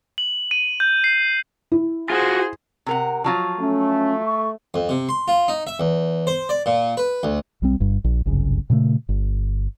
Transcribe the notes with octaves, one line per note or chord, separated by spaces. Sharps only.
F#7
D#7
G6
C7
E4
F4 F#4 G#4 C5
C3 A#4 F#5
F3 F#3 F4
A3 C#4
C#6
F2
C3
C6
F4
D#4
E5
E2
C5
D5
A#2
B4
D2
B1 G3 C4
G1 G2
A#1
G1 C2 F#2 C#3
A#2 C#3 G3 A3
G1